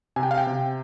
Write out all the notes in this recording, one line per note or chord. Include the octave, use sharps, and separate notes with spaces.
C3 G#5
G5
F5
G5
C3